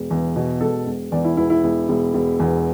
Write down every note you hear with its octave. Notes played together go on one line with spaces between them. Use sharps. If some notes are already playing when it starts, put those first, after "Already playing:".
Already playing: E1
E2
B2
E1 A4
E1
E2 D5
E4
E1 E4
E4
E1
E1
E1
E2